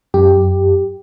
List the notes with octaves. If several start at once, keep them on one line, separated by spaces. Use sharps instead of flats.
F#2 G4